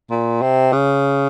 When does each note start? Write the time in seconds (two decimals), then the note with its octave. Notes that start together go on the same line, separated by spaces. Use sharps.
0.11 A#2
0.42 C3
0.73 C#3